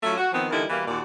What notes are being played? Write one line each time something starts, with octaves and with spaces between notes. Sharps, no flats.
F#3 A3 C#4 E4 F4
F#4
D#3 F3 B3 C4
D3 E3 G3 A#3 D#4 E4
B2 E3 G3 A#3
D#2 A#2 F#4 D5